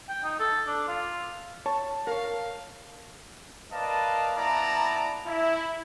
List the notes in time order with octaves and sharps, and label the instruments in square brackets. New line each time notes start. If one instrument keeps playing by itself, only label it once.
[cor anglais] G5
D#4
A4
D4
F4
[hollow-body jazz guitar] C#5 [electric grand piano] A5
[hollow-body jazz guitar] A#4 C#5 [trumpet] F5
[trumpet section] A#4 B4 D5 D#5 F5 A5
B3 E4 D5 A5 A#5
E4